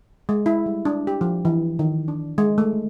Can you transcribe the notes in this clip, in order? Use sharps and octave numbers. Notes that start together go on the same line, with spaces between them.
G#3
E4
G3
D4
G4
F3
E3
D#3
D4
G#3
A3